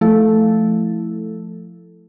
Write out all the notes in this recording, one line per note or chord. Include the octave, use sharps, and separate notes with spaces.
F3 A3 E4 A4